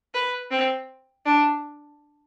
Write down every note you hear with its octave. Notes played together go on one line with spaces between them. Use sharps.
B4
C4
D4